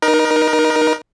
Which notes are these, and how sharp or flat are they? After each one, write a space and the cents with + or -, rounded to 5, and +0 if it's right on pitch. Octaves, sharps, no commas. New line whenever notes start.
D#4 -15 A#4 +30